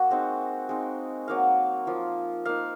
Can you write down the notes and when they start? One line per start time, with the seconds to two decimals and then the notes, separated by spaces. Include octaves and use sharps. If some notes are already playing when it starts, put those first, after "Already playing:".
Already playing: A#3 F#4
0.10 G#3 C4 D#4
0.69 G#3 C4 D#4
1.28 F#3 A#3 D#4 F5
1.87 F3 A#3 F4
2.45 A#3 D#4 F5